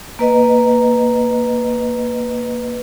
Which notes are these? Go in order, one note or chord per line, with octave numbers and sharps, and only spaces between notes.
A#3 B4 D#5